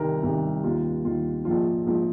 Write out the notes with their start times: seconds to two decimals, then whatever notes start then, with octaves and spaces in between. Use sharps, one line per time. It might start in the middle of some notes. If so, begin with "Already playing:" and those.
Already playing: C2 C3 D#3 A#4
0.23 C2 C3 D#3
0.63 D#2 D#3 F4
1.04 D#2 D#3 F4
1.45 A#1 G#2 F3 F4
1.86 A#1 G#2 F3